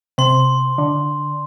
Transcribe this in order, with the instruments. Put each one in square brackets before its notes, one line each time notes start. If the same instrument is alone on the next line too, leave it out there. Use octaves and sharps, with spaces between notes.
[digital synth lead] C3 [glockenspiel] C6
[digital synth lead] D3